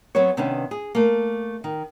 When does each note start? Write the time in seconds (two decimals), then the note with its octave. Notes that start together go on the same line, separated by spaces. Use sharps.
0.15 F#3 B3 C4 F#4 C#5
0.37 C3 D#3 B3 C#4 D4 B4
0.71 G#4
0.95 A3 A#3
1.64 D#3